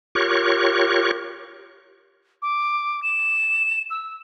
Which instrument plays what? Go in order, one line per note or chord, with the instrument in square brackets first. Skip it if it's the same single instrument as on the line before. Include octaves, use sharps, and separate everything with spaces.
[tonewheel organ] F4 G4 A#4 C#5 C#6 F#6
[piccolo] D6
E7
E6